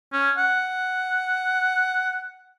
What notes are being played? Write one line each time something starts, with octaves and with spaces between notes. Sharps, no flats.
C#4
F#5